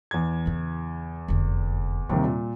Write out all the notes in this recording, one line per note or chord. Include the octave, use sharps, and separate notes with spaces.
E2 G#6
C#3 E4
F1 D3
D#2 C3 D#3 G3
A#2